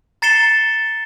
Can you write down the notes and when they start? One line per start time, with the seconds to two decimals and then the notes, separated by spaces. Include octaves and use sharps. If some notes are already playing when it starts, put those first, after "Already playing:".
0.22 A#5 A6 C7 C#7 E7 G7